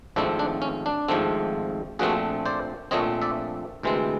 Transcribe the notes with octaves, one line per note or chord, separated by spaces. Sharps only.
G#1 G#2 F3 A3 C4 D4 E4
D4
C#4
D4
G#1 G#2 F3 A3 C4
A#1 A#2 F3 A3 C4 F#4 G#4
C5 D5
A#1 A#2 F3 A3 C4 C#5 D#5
D5 E5
D2 C3 E3 G#3 C4